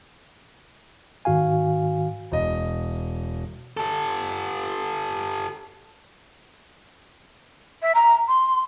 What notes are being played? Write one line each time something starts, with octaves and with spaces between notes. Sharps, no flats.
G#2 D#3 F#4 F5 G#5
E1 D#5
G4 A4
E5
A#5
C6